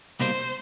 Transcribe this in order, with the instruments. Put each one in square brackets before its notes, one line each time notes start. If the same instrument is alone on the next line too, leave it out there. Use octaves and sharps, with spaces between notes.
[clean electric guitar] C2 B2 G3 A#3 D#4 [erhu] C5